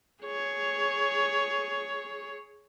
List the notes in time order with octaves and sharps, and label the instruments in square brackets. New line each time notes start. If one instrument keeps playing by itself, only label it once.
[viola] G#4 C#5